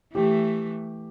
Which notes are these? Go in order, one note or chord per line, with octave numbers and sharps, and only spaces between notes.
E3 A3 G4